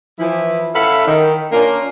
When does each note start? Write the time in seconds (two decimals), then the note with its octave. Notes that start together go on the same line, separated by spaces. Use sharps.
0.19 E3 F3 E4
0.75 C#4 E4 A4 F5 F#5 B5
1.07 D#3
1.52 A#3 C#4 D4 F4 A#4